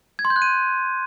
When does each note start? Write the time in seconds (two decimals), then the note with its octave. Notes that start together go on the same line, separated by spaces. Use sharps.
0.19 G#6
0.25 C6
0.30 G6
0.36 F#6
0.42 D#7